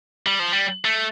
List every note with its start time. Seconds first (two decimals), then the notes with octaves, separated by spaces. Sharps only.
0.26 G3
0.39 F3
0.52 G3
0.85 A3